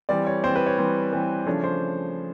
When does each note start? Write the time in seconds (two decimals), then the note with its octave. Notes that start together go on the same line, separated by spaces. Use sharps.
0.09 E3 G3 C4 D5
0.27 C#5
0.44 E3 G3 C4 C5
0.56 B4
0.67 C#5
0.78 E3 G3 C4
1.13 E3 G3 C4
1.46 C#3 F3 A3 D4 C#5
1.64 C5